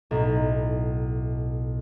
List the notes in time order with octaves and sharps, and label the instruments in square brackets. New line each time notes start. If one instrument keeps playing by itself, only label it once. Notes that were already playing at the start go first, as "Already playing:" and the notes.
[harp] B1 A2